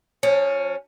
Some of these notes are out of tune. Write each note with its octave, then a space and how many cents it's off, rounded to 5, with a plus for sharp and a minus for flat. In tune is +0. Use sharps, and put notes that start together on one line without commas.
F3 +35 C#4 +0